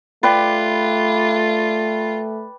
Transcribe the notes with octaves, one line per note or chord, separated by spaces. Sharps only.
A3 F4 B4 D5 G5